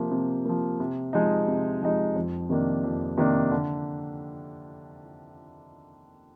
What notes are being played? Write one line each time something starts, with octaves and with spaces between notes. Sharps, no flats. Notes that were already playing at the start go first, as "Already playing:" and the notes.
Already playing: C3 F3 A#3
C3
F3 A#3
C3
F3 G#3 D#4
C3
F3 G#3 D#4
F2
C3 D#3 A#3 D4
F2
C3 D#3 A#3 D4
D3